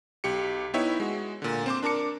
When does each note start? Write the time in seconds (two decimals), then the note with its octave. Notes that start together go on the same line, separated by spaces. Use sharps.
0.24 B1 G4 C#7
0.74 B3 D#4 E4 C#5 E5 G5
1.00 G#3 F#4
1.42 A#2 D3
1.66 C4 C5 D6
1.83 D4 A#4 A5 D6 C#7